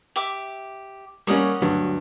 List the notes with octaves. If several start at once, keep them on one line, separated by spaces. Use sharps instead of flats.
G4 E5 D6
G3 A#3 C#4 C#5 D#5 F#5
D2 G2 F#3